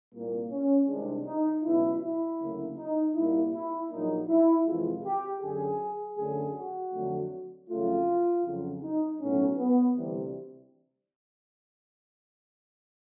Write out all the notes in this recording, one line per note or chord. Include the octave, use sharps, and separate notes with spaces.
C2 A#2 G3 A#3
C#4
C2 C3 D#3 G#3 D4
D#4
C#2 B2 F#3 E4
E4
D2 C#3 F#3 A#3
D#4
C2 A#2 G3 A#3 E4
E4
A#1 A#2 F#3 A#3 D#4
E4
F2 C3 E3 G#3 F4
G4
F#2 D3 F#3 G#4
F#2 D3 F#3 A3 G#4
F#4
F2 D3 F#3 A3
F2 C#3 F#3 A3 F4
F2 C#3 F#3
D#4
B1 A2 F#3 C#4
B3
D2 C3 E3 G3